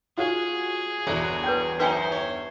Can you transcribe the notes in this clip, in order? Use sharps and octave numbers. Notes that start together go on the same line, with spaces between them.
F4 F#4 G#4 C#5
G1 E2 F#4
B4 C#5 G5
F#2 D#4 B4 C5 E5 G5 G#5
C#5